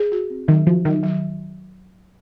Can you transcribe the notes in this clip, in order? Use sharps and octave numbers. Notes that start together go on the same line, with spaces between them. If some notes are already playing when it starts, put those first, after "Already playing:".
Already playing: G#4
F#4
C4
D#3 F#3
F3 F#4
D#3 F#3
F#3